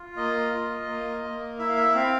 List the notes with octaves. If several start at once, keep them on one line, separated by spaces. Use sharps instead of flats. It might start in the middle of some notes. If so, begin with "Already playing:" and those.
Already playing: F4
A#3 D#5
F4
A#3
A#3
E4 E5
F5
E5
C4 F5